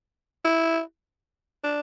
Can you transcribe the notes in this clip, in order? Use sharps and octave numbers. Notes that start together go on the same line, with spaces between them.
E4
D4